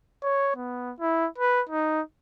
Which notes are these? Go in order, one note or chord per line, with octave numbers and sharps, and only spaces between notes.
C#5
B3
E4
B4
D#4